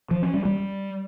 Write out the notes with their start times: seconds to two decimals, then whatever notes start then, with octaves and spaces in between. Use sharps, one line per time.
0.11 F3
0.22 C#4
0.34 G3
0.45 G3